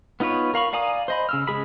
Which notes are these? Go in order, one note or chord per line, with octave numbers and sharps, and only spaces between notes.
B3 D#4 F4 B4 C#5
A#4 F5 B5 C#6
D5 F5 G#5 A#5 D#6
C5 D#5 B5
C#3 E6 F6
C#3 G#3 G#4 B5